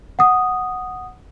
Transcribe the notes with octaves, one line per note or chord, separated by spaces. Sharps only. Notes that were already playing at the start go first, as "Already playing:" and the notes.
F#5 D#6